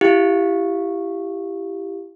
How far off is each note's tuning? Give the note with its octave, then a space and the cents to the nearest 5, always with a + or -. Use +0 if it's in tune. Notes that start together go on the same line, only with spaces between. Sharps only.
E4 +20 G4 +0 F5 +0